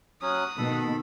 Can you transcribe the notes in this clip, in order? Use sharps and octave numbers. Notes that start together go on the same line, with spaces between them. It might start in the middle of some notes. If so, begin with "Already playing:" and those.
F#3 C#4 D#6 F#6
B2 D#3 A4 B5